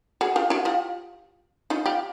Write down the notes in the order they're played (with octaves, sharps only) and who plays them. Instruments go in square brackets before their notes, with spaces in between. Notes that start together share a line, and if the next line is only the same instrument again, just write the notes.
[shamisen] F#4 G#4
F4 G4
E4 F#4
F4 G4
D#4 F4
F4 G4